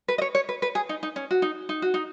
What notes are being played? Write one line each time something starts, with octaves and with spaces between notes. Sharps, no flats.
B4
D#5
C#5
C#5
B4
B4
G#4
D#4
D#4
C#4
F#4
D#4
D#4
F#4
D#4